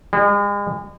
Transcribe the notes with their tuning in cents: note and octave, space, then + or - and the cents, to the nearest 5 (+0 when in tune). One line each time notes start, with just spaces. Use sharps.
G#3 -40